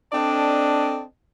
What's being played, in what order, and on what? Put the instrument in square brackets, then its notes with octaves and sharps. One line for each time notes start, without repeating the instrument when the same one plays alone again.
[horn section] C4 D4 A4 D5 D#5 A5